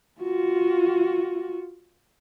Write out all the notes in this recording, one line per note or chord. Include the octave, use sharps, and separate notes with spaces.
F4 F#4